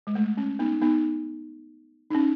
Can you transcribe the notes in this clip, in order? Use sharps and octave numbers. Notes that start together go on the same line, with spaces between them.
G#3
A3
C#4
B3 D#4
B3 D#4
D#4
C#4